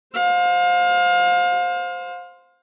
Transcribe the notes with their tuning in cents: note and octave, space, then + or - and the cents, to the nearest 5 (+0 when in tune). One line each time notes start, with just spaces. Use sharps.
C5 +0 F5 +30